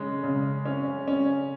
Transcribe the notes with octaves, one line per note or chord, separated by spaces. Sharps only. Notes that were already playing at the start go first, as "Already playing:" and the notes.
Already playing: C#3 G#3
C#3
C#4
C#4